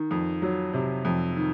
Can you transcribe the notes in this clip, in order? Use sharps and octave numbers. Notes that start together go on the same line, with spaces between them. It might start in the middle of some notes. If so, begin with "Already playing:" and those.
Already playing: D#3
F2
F#3
C3
F2
D#3